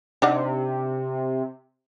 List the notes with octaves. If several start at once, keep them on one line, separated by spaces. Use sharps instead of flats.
C3 D4 D#4 F#5